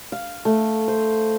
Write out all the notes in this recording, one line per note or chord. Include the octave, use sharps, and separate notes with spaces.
F5
A3
C5